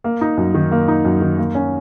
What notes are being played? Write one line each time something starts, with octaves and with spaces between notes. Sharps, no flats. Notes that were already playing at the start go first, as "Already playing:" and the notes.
A#3
D#4
F#2
D#3
A#3
D#4
F#2
D#3
A#3
C#4